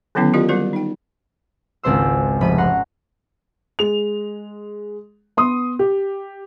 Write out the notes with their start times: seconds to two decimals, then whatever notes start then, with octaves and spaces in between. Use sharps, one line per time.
0.15 D3 D#3 F#3 B3 C#4 E4
0.34 F4 G4 A#4 D5 D#5 F5
0.49 G3 A#3 F#4 A#4 C5
0.73 D#4 G5
1.83 G#1 C#2 C4 C5 C6 E6
2.41 F1 B5 D#7
2.58 F#5 A#5 C6 C#6
3.79 G#3 F7
5.37 B3 C6 D#6
5.79 G4